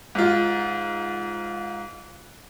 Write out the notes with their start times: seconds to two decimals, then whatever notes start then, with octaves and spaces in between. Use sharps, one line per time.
0.15 G#2 F4